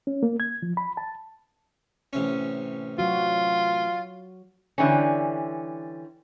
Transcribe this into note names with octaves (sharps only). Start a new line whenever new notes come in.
C#4
A#3
G#6
F3
B5
A5
A1 C3 C#4
F#3 F4 F#4
D3 E3 G3 C#4